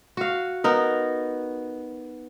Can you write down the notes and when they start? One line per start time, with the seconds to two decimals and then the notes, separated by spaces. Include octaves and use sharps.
0.17 F#4 F5
0.64 B3 D#4 A#4